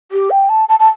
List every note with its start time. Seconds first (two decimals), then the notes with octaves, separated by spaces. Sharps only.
0.11 G4
0.30 G5
0.49 A5
0.68 A5
0.79 A5